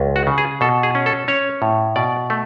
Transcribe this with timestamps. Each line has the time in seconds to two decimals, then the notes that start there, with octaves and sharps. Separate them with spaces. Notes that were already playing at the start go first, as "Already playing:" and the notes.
Already playing: C#2
0.16 F#4
0.27 C#3
0.38 G#4
0.61 B2 A4
0.83 G#4
0.95 C#4
1.06 A4
1.28 C#4 C#5
1.62 A2
1.96 B2 D5
2.30 A3